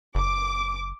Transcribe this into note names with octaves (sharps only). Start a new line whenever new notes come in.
F#1 D6